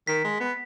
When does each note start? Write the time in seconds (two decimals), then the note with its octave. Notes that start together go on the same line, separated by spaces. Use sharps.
0.07 D#3 B6
0.24 G#3
0.40 B3